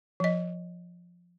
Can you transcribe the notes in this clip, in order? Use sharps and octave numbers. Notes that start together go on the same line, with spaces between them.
F3 D#5